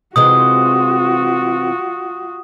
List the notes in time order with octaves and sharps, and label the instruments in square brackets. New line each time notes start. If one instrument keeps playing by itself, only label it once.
[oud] C3 E3 G#3 [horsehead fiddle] F4 F#4 [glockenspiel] D#6